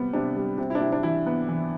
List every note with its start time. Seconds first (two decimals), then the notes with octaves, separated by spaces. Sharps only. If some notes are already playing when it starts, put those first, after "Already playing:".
Already playing: C3 G3 B3
0.13 C3 D4
0.36 G3
0.58 C3
0.70 E4
0.75 D4
0.80 C3 E4
0.92 D4
1.03 E3 E4
1.26 B3
1.49 E3